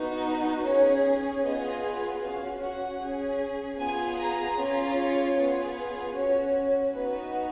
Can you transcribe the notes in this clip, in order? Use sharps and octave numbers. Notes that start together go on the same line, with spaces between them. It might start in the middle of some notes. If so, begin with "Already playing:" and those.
Already playing: B3 D#4 F#4
C#4 G#4 C#5
B3 F4 G#4 D#5
C#4 F#4 F5
F#5
C#4 G#4
B3 F4 G#4 G#5
A#5
C#4 F4 G#4
C#5
B3 F4 G#4
C#4 F#4 C#5
B3 D#4 F#4 B4